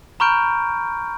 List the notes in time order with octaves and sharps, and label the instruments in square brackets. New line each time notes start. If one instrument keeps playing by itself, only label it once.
[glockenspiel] A#5 B5 C#6 F6 G6 D7